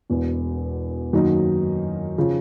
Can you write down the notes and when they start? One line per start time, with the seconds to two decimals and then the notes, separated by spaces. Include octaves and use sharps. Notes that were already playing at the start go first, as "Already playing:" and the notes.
0.10 E1 E2 B2
1.13 F#2 D#3 F#3 A#3 D#4
2.18 C#3 F3